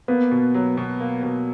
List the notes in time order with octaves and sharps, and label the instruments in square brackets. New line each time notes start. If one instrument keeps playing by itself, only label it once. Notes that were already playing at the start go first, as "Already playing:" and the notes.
[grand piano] A#3 [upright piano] B3
[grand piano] B2
F#3
B2
A#3
B2